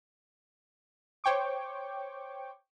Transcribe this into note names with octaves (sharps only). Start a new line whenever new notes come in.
C5 C#5 G5 C#6 D6